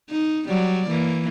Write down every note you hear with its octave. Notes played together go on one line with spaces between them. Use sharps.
D#4
F#3 G3 D5
E3 A#3